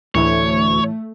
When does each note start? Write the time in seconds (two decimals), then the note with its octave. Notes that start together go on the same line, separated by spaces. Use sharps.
0.15 D2 A2 E3 A3 E4 C#5